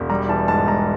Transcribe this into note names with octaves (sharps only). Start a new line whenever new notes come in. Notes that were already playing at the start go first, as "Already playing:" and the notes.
Already playing: E1
G3 A#5
E3 A5
G#2 A5
G#2 A#5